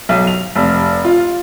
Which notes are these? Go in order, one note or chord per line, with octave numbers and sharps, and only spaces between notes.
B1
F7
F1
F4